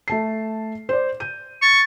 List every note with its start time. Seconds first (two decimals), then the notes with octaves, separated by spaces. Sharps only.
0.08 A3 A5 C7
0.89 C5 D5
1.20 G6 D#7
1.62 C#6 A6